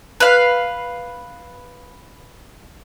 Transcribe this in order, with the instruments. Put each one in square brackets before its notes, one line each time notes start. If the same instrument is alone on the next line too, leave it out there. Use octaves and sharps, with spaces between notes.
[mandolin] B4 F5